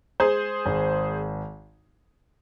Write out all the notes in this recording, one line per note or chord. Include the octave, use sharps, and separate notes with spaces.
G#3 G#4 C5
G#1